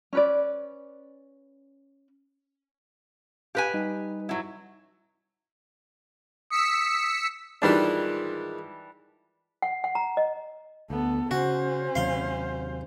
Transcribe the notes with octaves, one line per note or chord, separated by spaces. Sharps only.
C#4 B4 D5
G4 B4 F5 G#5
G3 D#4 D#5
F#3 E4
D#6 E6 B6 C#7
G#2 D#3 E3 G3 D4 F4
F#5
F#5
A#5
D#5
D2 B3 A4
C#3 C#4 F#4 C5
D#2 C3 F#3 F5 C6